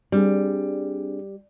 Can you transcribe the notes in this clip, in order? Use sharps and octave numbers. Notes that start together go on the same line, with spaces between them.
G3 C4 D4 G#4